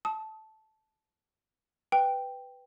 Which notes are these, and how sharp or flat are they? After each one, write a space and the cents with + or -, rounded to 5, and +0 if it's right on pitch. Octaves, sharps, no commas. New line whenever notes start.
A5 -10 D#6 +25
B4 +5 G5 +0